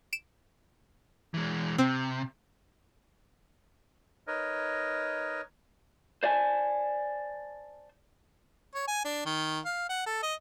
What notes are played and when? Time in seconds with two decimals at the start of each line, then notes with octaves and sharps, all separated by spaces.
0.13 D7 E7
1.34 E3 G#3
1.78 C3 C4
4.27 D#4 A#4 B4 C#5 D#5
6.23 C5 D5 D#5 G#5 A5
8.74 C#5
8.88 G#5
9.05 D4
9.25 D#3
9.65 F5
9.89 F#5
10.06 A4
10.23 D#5